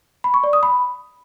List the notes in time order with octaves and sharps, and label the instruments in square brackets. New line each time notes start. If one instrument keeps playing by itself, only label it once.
[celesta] B5
C#6
D5
D#6
B5